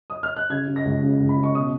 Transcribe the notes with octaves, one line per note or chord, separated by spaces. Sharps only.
D#6
F6
F#6
C#3 G#6
C#3
A#6
C#2
C#3
C#2
B5
C#3
C#6
B2 D#6